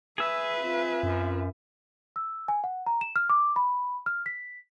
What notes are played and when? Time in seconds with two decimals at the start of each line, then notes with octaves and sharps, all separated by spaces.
0.18 G#4 B4 E5 E6
0.60 C4 F4
1.03 F#2
2.16 E6
2.48 G#5
2.64 F#5
2.86 A#5
3.01 E7
3.16 F6
3.30 D6
3.56 B5
4.06 F6
4.26 B6